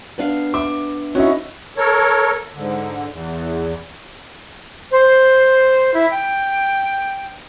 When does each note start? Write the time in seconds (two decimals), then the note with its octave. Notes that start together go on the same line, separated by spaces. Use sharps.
0.18 B3 D4 F5
0.54 E5 D6
1.15 C#4 D#4 E4 F#4
1.77 A4 A#4 C#5
2.54 G#2 D3
3.11 E2
4.91 C5
5.94 E4
6.11 G5